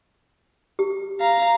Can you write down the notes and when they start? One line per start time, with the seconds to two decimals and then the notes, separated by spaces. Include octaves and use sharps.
0.79 G4
1.20 F5 A#5